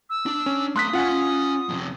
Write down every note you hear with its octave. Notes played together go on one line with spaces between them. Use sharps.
E6
D4
C#4
A3 F5 C6 D#6 F#6 B6
C#4 F4 F#5 G#5
F2 C3